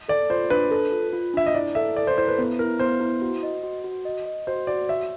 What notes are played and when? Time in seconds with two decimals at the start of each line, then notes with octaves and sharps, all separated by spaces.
0.09 A4 D5
0.30 F4 C5
0.50 D4 B4
0.71 A4
0.92 F4
1.13 F4
1.34 D4 E5
1.46 D#5
1.54 E4 D5
1.75 A4 E5
1.96 A4 D5
2.07 C5
2.18 E4 C5
2.28 B4
2.39 B3 B4
2.59 E4 A#4
2.79 B3 C5
3.01 E4
3.22 F#4
3.43 D#5
3.64 F#4
3.84 F#4
4.05 D#5
4.26 D#5
4.47 F#4 C5
4.67 F#4 D5
4.88 C#5 E5